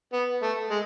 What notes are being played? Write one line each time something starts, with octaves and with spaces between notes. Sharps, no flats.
B3
A3
G#3